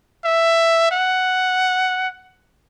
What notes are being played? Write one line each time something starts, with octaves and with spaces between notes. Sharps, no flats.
E5
F#5